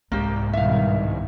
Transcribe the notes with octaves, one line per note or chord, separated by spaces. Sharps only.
C2 G#2 A#3 G4
G2 B2 D#3 E5 F5